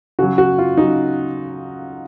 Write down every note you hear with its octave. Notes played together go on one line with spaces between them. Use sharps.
C#3 F#3 F#4
F#4
F4
C#3 F#3 D#4